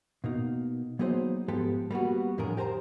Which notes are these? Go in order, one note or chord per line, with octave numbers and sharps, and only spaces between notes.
B2 A#3 D#4
F#3 A#3 B3 D#4 G#4 C5
G#2 F3 G#3 B3 G4 A4
G3 A#3 B3 F#4
F2 A2 D3 F3 G#4 A#4
G4 A#4 C5 G#5 A#5